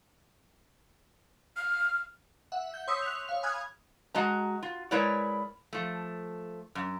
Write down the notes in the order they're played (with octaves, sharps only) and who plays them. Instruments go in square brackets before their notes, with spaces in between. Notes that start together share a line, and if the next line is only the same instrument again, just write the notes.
[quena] F6
[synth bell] E5 F#5
G6
C#5 C6 C#6 D#6 E6 B6
F#6 F7
C#5 F5
G#5 B5 D#6 F6 F#6 G#6
[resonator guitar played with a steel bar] G#3 F#4 D#5 A#5
F4
G#3 E4 A#4 B4 C#5 D5
F3 A3
F#2